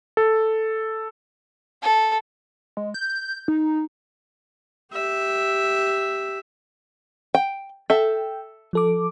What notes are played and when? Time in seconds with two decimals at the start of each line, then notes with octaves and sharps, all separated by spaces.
0.17 A4
1.82 A4
2.77 G#3
2.94 G6
3.48 D#4
4.92 G4 E5
7.35 G5
7.90 A4 E5 G5
8.73 F3 A4 D6